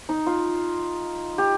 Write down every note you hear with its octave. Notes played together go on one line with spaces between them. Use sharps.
D#4
F4
G4